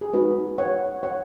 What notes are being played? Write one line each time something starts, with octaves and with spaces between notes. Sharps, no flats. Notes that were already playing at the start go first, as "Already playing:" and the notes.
G#4
G#3 D#4 F#4 B4
C#5 F#5
C#5 F#5